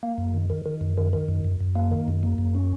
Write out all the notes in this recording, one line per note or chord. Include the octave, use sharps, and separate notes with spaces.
A#3
F#2
D#3
D#3
D#3
F#2
D#3
D#3
F#2
F#2
F#2
A#3
D#3
F#2
A#3
F#2
C#4